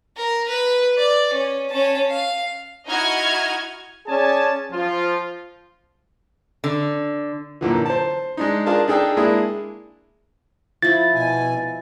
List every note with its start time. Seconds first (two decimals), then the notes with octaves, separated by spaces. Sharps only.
0.17 A#4
0.48 B4
0.98 D5
1.33 C#4
1.71 C#4 A5
2.10 F5
2.88 D#4 E4 F#4 D#5 F6 G#6
4.07 C#4 G#4 D5 G#5 A5
4.72 F3 F4
6.64 D3
7.61 F#2 A#2 D3 E3
7.86 C5 A5
8.37 G#3 D4 D#4
8.66 D4 F4 G#4 A#4 D5 A5
8.88 D4 D#4 G#4 A4 G5 A5
9.17 G#3 A#3 D4 E4 G#4
10.82 F3 E4 A6
11.15 B2 G#5